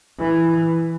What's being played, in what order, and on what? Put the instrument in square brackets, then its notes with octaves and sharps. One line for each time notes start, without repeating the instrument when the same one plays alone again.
[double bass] E3